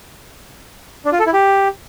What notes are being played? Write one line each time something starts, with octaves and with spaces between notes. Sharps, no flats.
D4
F4
A4
E4
G4